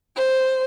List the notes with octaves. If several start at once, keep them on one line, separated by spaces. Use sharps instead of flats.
C5